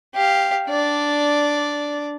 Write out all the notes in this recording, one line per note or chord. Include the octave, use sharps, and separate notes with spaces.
G4 F5
D4 D5